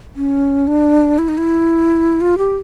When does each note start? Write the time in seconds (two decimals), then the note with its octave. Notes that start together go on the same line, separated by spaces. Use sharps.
0.16 C#4
0.67 D4
1.18 E4
1.29 D#4
1.38 E4
2.21 F4
2.38 G4